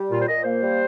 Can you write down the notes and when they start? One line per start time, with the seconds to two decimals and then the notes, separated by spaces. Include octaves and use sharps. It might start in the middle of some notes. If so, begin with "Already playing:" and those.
Already playing: G3
0.10 A#2 F4
0.21 C5
0.27 A#2 D#5
0.44 A#3 C5
0.62 G3